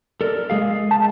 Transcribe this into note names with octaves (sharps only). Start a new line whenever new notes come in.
A4 A#4 D5
G#3 G#4 F5
A5